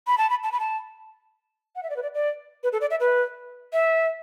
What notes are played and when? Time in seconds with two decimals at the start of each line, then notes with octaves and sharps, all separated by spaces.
0.07 B5
0.18 A5
0.30 B5
0.44 A5
0.52 B5
0.60 A5
1.76 F#5
1.83 E5
1.90 D5
1.96 B4
2.03 D5
2.14 D5
2.63 B4
2.72 A4
2.81 D5
2.91 E5
3.00 B4
3.73 E5